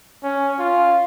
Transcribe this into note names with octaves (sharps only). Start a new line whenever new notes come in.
C#4
F4